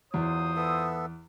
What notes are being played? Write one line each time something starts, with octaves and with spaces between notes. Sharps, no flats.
E2 F#3 F4 C5 D#6
B3 A4 E5